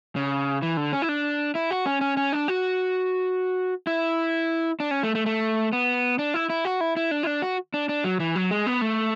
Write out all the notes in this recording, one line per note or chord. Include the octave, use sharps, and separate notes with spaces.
C#3
E3
D3
C#4
E4
D4
E4
F#4
C#4
C#4
C#4
D4
F#4
E4
D4
C#4
A3
A3
A3
B3
D4
E4
E4
F#4
E4
E4
D4
E4
D4
F#4
D4
D4
F#3
E3
F#3
G#3
B3
A3